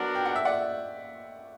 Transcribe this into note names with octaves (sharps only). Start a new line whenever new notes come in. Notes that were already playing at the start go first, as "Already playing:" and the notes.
Already playing: F#3 B3 D4 F#4 A#4
G5
F#5
E5
D5 F#5